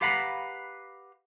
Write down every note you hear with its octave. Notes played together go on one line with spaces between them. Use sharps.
G4 B4 F5 F#5 A#5 B5